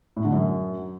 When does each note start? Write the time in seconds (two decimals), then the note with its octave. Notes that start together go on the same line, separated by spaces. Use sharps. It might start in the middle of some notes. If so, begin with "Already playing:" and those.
0.17 A2
0.25 D3
0.33 F#2